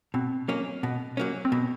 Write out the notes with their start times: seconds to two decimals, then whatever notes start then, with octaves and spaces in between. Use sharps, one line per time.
0.14 B2 C4
0.48 F#3 A#3 C#4
0.83 B2
1.17 F#3 A#3 C#4
1.45 C4
1.52 B2 B3